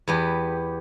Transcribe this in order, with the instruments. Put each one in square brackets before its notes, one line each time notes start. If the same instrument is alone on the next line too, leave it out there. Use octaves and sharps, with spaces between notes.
[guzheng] E2 B3 G4